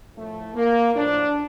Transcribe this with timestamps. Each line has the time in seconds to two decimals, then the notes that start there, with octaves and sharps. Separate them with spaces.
0.16 A2 F3 A3
0.55 A#3
0.94 A2 F3 D4